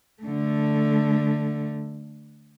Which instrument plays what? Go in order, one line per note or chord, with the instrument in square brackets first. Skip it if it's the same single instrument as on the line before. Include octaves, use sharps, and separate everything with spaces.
[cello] D3 A3